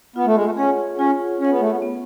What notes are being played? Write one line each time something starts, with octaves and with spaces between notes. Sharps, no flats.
B3 F4
A3
G#3
A3
C#4 G#4 C#5 F#5
C#4 F4
C#4 G#4 C#5 F#5
B3
A3
B3
B3